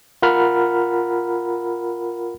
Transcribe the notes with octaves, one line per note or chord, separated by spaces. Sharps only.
F4 A#4 F#5 A#5 B5 F6